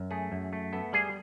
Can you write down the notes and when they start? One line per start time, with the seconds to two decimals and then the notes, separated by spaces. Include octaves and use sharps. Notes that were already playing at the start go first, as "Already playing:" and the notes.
Already playing: F#2
0.11 A3 G#4
0.32 F#2
0.53 A3
0.73 B3 A4
0.93 G3 G#4